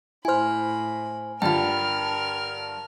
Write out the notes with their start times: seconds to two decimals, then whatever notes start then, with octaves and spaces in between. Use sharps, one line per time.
0.25 A2 E4 C5 G#5 B5 F6
1.42 G2 D3 F4 A#4 G5 A5 B5 F6